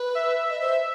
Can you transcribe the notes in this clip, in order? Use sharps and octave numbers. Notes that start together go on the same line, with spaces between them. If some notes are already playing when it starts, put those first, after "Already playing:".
Already playing: B4
E5
D#5
C5